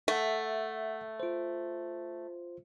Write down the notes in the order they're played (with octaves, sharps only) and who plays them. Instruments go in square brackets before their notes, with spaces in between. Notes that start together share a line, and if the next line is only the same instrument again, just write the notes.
[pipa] A3 [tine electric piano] E5 F#5
[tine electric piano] F4 C5